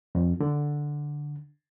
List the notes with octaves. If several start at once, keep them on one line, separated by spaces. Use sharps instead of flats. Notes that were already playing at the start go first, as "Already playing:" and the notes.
F2
D3